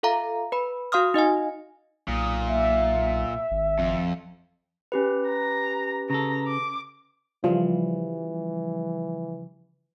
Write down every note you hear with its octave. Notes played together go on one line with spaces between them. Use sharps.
F4 A4 E5 F5 A#5
B4 B5
F#4 F5 C6 D#6 F6
D#4 D#5 F5 G#5
B1 A#2 D#6
E5
G#1
F2
C#4 G4 B4
A#5
C#3 A4 A#5
D6
C#3 E3 F3 G3 F4